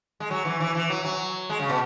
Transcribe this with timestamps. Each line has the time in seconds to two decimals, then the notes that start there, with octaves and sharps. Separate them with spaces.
0.20 G#3
0.31 F#3
0.45 E3
0.60 E3
0.75 E3
0.90 F#3
1.05 F#3
1.50 G#3
1.59 C#3
1.69 B2